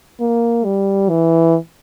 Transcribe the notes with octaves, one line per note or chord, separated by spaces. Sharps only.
A#3
G3
E3